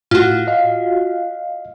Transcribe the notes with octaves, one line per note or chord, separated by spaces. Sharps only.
A2 F4 F#4
D#5 F5